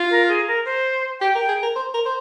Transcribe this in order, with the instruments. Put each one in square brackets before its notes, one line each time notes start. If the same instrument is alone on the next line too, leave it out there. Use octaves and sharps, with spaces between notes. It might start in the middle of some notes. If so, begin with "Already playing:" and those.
Already playing: [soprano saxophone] F4
[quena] A#4
G#4
A#4
C5
[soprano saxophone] G4 [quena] G5
[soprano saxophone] A#4
[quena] G5
[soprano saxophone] G#4
A#4
C5
A#4
C5